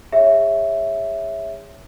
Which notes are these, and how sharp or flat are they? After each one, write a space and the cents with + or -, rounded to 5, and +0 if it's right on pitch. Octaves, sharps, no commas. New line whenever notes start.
G#4 -30 C#5 +0 E5 +0